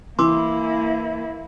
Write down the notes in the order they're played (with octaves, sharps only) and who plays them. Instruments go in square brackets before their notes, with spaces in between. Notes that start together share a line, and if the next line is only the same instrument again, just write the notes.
[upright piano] E3 [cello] A#3 E4 [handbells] C6 D6 E6